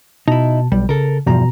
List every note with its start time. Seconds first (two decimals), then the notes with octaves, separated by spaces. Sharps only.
0.28 B2 D#4 E4 A5
0.72 B1 G3
0.89 C#3 A4 A#4
1.27 E2 G2 B2 F3 A#5